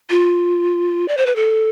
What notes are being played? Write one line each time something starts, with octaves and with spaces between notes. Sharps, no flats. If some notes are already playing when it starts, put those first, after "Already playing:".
F4
D5
C5
B4
A4